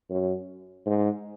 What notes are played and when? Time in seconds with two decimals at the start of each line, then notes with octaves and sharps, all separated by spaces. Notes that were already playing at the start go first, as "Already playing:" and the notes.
0.10 F#2
0.86 G#2